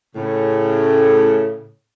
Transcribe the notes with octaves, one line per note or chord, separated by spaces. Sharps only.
A2 C#3